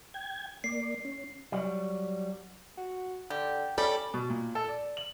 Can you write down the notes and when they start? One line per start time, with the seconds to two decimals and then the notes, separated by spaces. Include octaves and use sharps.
0.14 G5 G#6
0.64 A#3 D5 C7
1.05 C#4
1.52 F#3 G3
2.78 F#4
3.30 D3 G4
3.78 G3 C#4 A4 D5 G5
4.14 B2
4.30 A#2
4.55 A4
4.68 D5
4.97 F#7